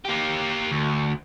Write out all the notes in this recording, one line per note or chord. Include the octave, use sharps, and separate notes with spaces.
A#3 G4
D2